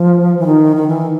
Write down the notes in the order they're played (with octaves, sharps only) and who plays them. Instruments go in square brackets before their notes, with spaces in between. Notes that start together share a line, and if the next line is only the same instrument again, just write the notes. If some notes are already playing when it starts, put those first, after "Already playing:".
Already playing: [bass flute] F3
E3
D#3
D#3
E3